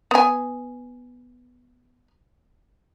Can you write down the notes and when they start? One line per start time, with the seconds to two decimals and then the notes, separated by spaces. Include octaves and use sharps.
0.11 B3 G#5